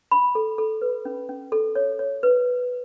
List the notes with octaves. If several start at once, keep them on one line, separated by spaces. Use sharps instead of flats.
B5
A4
A4
B4
C#4
C#4
A4
C#5
C#5
B4